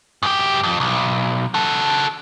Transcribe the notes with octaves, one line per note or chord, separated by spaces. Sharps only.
F#2 G4
F2
B1
F#4 A4